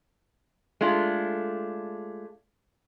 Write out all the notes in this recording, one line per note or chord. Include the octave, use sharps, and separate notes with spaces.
G#3 A3 D4 F4